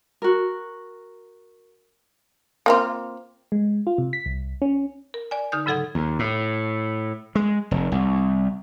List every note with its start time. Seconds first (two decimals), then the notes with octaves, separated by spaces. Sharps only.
0.22 F#4 A#4
2.66 A#3 C4 F4
3.52 G#3
3.87 F4
3.98 C3
4.13 B6
4.26 C2
4.62 C#4
5.14 A#4
5.31 D5 G#5
5.52 D3 D#4 D#6 G6
5.66 G#2 C#3 F#3 A4 F#5 G#6
5.95 D#2
6.19 A2
7.35 G#3
7.71 F1
7.92 C2